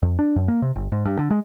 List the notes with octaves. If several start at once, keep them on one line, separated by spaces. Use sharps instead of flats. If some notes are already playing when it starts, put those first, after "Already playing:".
F2
D4
F#2
A#3
C3
G1
G#2
G2
D3
G#3